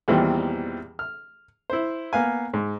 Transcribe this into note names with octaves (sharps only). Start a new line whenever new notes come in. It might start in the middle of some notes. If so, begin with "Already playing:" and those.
E2 A#2 D#3 E3 G3 C4
F6
E4 C5
A#3 B3 F5 G#5
G#2